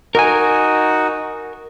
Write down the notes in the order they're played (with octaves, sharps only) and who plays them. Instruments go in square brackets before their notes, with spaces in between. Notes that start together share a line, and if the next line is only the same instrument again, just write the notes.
[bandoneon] D#4 F#4 [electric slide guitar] A#4 G#5